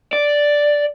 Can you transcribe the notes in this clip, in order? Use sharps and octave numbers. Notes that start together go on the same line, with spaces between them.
D5